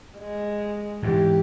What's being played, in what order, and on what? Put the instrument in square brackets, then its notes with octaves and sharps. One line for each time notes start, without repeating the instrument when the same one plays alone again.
[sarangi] G#3
[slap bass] G#2 E3 [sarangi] G4